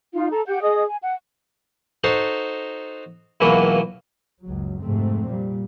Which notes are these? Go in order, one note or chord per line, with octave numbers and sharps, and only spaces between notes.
D#4 F4 F5
A4 A#5
G4 F#5 G5 G6
G#4 D#5 D#6
G#5
F#5
D#4 F#4 A4 C5 A#5 C6
C#2 B2 E3 F#3 A#3
F#1 C#2 F#3
F2 G#2 C3 A3 C4
A#2 G3